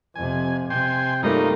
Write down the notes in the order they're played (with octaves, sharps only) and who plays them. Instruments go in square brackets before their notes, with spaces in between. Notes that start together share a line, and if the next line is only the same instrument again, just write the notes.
[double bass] F2 C3 [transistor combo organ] G#5
[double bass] C3 [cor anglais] G5 [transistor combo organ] G#5 C6
[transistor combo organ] G2 F4 [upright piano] G3 A3 A#3 [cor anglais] D#4